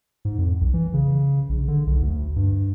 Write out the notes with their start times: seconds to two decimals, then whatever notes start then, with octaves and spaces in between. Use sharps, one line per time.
0.25 G#2
0.39 F2
0.61 B1
0.74 E3
0.94 C#3
1.49 A#1
1.68 D3
1.87 B1
2.02 D2
2.36 G2